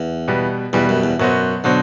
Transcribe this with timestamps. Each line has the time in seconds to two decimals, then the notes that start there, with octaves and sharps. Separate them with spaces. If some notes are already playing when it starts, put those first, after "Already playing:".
Already playing: E2
0.28 B2 G3 B3
0.73 E2 B2 G3 B3
0.89 F#2
1.04 E2
1.19 F#2 B2 F#3 B3 F#4 C5
1.64 B2 D3 F#3 B3 F#4 C5